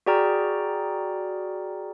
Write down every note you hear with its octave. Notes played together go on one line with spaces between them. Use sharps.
F#4 G#4 D5 G5 A#5 F6